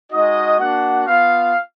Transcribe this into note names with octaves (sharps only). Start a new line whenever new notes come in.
G#3 D#4 F#4 D#5
A#3 D4 F#4 F#5
B3 F4 F5